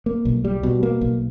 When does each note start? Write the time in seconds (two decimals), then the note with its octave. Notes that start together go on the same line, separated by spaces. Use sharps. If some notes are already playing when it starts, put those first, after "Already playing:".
0.06 A#3
0.25 B1
0.44 G3
0.63 B2
0.83 A#3
1.01 B1